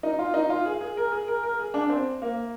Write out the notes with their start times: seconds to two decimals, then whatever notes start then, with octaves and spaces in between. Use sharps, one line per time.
0.03 D#4
0.19 F4
0.34 D#4
0.50 F4
0.65 G#4
0.81 G#4
0.97 A#4
1.12 G#4
1.28 A#4
1.43 A#4
1.59 G#4
1.74 D4
1.89 C4
2.22 A#3